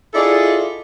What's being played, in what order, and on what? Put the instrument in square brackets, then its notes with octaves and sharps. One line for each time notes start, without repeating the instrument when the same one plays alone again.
[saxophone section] E4 F4 G#4 A4 D5 D#5